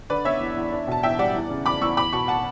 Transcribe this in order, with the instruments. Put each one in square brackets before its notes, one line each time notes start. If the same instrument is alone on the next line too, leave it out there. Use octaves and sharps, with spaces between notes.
[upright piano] D3 B4 D5
B3 C#5 E5
E2
E2
D4
B2 A5
E2 E5 G5
G3 D5 F#5
E2
C#3
E2 B5 D6
E2 C#6 E6
E2 B5 D6
B2 A5 C#6
F#5 A5